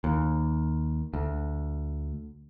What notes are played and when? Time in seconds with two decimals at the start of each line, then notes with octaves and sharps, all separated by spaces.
0.04 D#2
1.14 D2